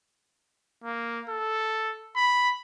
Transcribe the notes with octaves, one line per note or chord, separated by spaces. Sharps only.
A#3
A4
B5